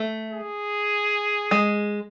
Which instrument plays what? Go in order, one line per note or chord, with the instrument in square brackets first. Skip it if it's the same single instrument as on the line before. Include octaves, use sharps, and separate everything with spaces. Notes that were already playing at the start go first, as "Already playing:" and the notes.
Already playing: [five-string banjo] A3
[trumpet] G#4
[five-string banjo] G#3